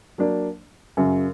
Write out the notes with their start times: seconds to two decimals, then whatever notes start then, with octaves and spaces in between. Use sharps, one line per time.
0.18 F#3 A#3 D4
0.97 F#2 C#3 F#3